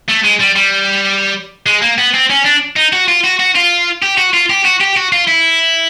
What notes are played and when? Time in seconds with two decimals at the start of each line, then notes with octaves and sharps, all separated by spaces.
0.09 A3
0.24 G#3
0.40 G3
0.56 G3
1.66 G#3
1.82 A#3
1.98 B3
2.14 C4
2.30 C#4
2.45 D4
2.76 D#4
2.93 F#4
3.08 F4
3.24 F#4
3.39 F#4
3.55 F4
4.03 G4
4.18 F#4
4.34 F4
4.50 G4
4.65 F#4
4.81 G4
4.96 F#4
5.12 F4
5.28 E4